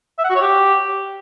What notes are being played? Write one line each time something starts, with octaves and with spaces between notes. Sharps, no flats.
E5
F#5
F#4
C#5
G4